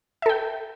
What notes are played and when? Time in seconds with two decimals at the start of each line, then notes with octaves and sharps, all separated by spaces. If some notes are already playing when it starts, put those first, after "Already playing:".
0.22 E5
0.26 A4
0.29 G5